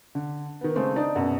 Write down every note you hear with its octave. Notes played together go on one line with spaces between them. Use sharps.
D3
D#3 B3
C#3 G#3 A3 C4
D4 D#4 D5 D#5
F#1 F#2 B2 F#5